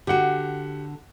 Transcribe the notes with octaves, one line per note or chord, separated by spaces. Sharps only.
D3 F#4 G4 F#5